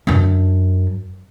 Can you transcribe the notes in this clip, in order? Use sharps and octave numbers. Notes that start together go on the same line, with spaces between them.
F#2 D4